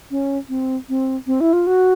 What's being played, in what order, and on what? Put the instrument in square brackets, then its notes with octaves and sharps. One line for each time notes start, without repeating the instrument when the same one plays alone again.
[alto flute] C#4
C4
C4
C4
E4
F4
F#4